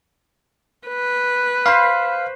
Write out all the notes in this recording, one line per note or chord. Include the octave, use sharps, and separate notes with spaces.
B4
C5 F5 B5 C#6